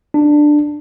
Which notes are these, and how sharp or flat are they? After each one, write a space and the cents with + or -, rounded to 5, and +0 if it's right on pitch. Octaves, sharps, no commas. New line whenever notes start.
D4 +10